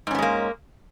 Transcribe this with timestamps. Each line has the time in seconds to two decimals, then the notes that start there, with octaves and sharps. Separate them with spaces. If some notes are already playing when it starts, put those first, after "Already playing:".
0.07 G#2
0.11 C#4
0.15 B3
0.18 G#3
0.22 A#3